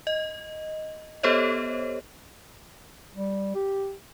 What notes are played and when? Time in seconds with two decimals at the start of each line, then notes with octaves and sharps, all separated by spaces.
0.07 D#5
1.23 B3 G4 A4 C5 C#5 D#5
3.16 G3
3.55 G4